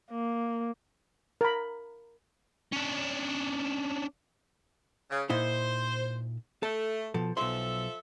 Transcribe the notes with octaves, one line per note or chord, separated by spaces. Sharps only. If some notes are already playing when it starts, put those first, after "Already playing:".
A#3
A#4 B5
C#4 D4
C#3
A#2 D#4 E4 C5
A3 A4
B2 F3 A4
B1 F3 A4 E5 C6